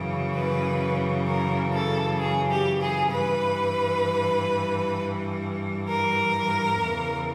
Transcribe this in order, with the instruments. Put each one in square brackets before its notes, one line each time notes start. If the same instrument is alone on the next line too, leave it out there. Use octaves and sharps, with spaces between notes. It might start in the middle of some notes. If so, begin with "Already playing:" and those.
Already playing: [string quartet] F#2 C#3 E3
B4
A#4
A4
G#4
G4
G#4
G2 E3 B4
A#4
E2 C#3 E3